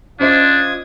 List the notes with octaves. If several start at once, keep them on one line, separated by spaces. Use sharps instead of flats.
C#4 D4 F4 C5 D#5 D#6 G#6